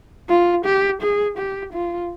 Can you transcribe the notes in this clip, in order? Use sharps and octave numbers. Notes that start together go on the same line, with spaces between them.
F4
G4
G#4
G4
F4